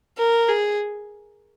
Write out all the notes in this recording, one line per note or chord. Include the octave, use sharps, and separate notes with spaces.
A#4
G#4